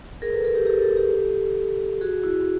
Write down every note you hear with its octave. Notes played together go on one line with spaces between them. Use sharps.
G#4 A#4
A4 B4
G#4 A#4
G4 A4
G4 A4
G4 A4
G4 A4
F#4 G#4
E4 F#4